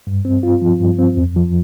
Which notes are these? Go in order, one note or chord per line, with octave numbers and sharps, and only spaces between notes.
G2
C4
F4
F3
G2
C4
F2
F3